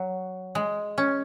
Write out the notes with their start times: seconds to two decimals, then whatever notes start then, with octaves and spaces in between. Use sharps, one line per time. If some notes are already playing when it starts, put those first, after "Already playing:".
Already playing: F#3
0.55 G#3
0.98 C#4